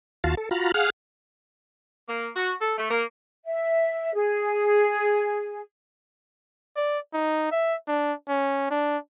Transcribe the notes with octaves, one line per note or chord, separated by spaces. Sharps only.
D#2 F4 F#4 F5 A5
A4
F4 F#4 A#5 B5 F6
G#4 F5 F#5 F6
A#3
F#4
A4
A3
A#3
E5
G#4
D5
D#4
E5
D4
C#4
D4